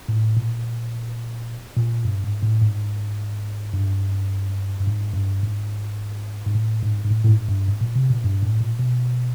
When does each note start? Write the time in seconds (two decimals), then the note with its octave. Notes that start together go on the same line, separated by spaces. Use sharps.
0.09 A2
0.37 A#2
1.77 A#2
2.05 G2
2.24 G#2
2.43 A2
2.61 G#2
3.74 G2
4.79 G2
4.87 G#2
5.14 G2
5.43 G#2
6.46 G#2
6.55 A2
6.83 G#2
7.05 G#2
7.11 A2
7.24 A2
7.29 G#2
7.49 G2
7.68 G#2
7.81 A#2
7.96 C3
8.10 A#2
8.24 G2
8.43 A2
8.61 A#2
8.79 B2